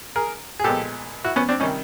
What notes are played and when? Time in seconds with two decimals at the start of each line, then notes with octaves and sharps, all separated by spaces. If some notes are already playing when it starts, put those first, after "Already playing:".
0.16 G#4 A#4
0.59 G#4
0.64 A#2 F3 G#3 B3 G4 A4
1.24 E4 F#4
1.36 B3 C#4
1.49 C4 D4
1.60 C3 D#3 G3 C#4 D#4